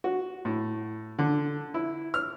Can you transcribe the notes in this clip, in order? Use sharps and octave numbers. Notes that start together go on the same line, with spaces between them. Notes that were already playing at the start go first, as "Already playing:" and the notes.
F#4
A2
D3
E4
F6